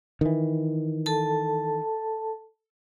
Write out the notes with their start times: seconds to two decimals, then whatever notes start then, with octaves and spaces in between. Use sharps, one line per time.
0.21 D#3 E3
1.06 A4 A5